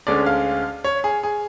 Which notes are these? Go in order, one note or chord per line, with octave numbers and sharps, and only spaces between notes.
D2 D3 G#3 C#4 D5
F5
C#5
G#4
G#4